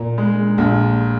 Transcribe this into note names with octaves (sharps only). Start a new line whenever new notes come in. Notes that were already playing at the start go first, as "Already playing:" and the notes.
Already playing: A#2
G#3
A#1